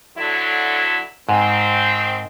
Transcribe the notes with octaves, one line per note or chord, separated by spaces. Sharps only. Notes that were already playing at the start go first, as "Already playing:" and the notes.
D3 F#3 E4
G#2 D#3 C4